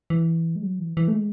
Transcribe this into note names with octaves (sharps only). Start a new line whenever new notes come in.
E3
G#3
F#3
E3
E3
A3
G#3